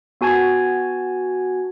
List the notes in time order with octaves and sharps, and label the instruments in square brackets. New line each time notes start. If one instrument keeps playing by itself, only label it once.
[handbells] B3 F#4 G#5 A5 G#6